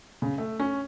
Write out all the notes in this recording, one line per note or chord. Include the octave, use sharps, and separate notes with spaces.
C#3
A3
C#4